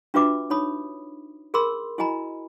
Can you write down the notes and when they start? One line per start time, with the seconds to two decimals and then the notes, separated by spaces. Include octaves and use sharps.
0.14 D4 F4 F#4 B4 E5 D6
0.50 D#4 C#5 B5 D#6
1.54 G#4 A#4 B5 C6 E6
1.98 E4 F#4 D#5 G#5 A#5 B5